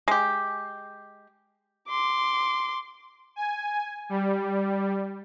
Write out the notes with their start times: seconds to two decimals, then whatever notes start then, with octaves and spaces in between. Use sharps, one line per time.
0.08 G#3 G4
1.89 C6 D6
3.36 G#5
4.09 G3